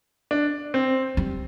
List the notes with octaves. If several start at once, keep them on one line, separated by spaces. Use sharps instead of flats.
D4
C4
G3